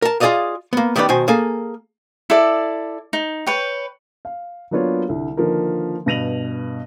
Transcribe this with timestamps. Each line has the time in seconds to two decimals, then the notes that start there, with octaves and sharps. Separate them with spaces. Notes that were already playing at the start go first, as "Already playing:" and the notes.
0.02 A#4 A5
0.20 F4 G#4 A#4 D5 D#5 F5
0.73 A#3 B3
0.96 D#3 G3 B3 D#4 B4 D5
1.09 B2 D#3 C5 G#5
1.28 A#3 G#4 A4 G#5
2.30 E4 A4 D5
3.13 D#4
3.47 B4 C#5 G5
4.25 F5
4.71 F#3 A#3 B3 D4 F4 C#5
5.08 C2 D3
5.37 D3 D#3 F3 A#3 A#4 B4
6.06 G2 B2 A#6 D#7 F7 F#7